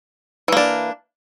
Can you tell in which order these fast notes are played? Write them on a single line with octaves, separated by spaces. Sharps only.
E3 A#3 D4